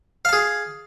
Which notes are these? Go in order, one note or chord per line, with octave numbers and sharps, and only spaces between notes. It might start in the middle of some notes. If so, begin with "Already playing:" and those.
G#4 F5 A5